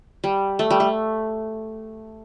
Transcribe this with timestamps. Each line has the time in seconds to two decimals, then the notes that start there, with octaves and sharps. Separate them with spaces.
0.24 G3
0.59 A3
0.70 G3
0.80 A3